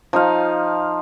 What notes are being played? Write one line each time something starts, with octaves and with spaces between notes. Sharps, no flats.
F3 D#4 F5